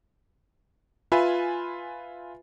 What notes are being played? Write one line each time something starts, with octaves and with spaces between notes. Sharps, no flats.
F4 B4 E5 G#5 B5